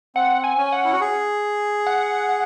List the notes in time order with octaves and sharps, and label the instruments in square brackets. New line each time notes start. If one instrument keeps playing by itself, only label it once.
[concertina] C4 [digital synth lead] F#5
[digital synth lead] G#5
[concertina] C#4
[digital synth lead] F#5
[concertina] E4
F#4
G#4
[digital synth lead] F#5
F#5